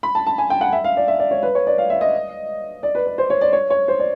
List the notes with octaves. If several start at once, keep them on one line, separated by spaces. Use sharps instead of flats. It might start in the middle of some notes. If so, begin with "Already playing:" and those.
B5
A5
A5
G#5
G5
F#5
E5
F5
D5
E5
D5
C#5
B4
C#5
D5
F5
E5
D#5
D5
B4
B4
C5
C#5
D5
C#5
C#5
C5
D5